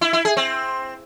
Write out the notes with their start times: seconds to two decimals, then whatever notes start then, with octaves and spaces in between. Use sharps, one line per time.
0.01 E4
0.13 E4
0.25 G#4
0.37 C4